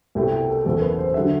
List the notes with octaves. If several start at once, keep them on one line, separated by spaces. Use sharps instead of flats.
C2 B2 A3 E4 G5
G5
A4
F#1 E2 B2 A3 A4
B4
C5
D3 F#3 E5